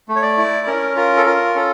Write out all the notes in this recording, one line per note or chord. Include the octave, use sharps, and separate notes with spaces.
A3
C#5
D5
E4
C#4 A#4
F4 A#4
A4
F4 A#4
C#4 A4